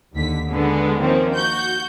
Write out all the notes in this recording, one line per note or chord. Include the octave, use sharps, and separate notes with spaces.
D#2 D3 B6
D3 G#3 B3
D#3 F3 A#3 C4 C#4
F#4 G6